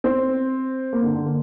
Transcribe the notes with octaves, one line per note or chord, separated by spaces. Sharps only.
C4
A#3
D3
D3
A#3